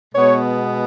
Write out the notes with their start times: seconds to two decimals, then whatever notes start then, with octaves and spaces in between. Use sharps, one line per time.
0.15 B2 G#3 B3 C#5